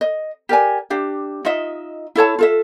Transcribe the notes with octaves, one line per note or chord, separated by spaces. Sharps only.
D#5
G4 A#4 D5 G#5
D4 G4 E5
D#4 F4 D#5 E5
E4 A4 C#5 A5
F4 A4 E5